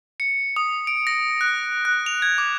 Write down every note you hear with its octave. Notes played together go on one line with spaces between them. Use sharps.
C#7
D#6
D7
A#6
F#6
F#6
F7
G#6
D6